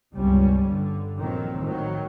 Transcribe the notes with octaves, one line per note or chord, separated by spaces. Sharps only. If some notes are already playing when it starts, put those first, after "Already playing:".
G1 C#2 C3 G3 C#4
G2 D3
A#1 D#3 F#3 C4
A2 D#3 F#3